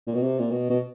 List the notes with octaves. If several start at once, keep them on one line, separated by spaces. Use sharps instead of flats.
A#2
B2
C3
A#2
B2
B2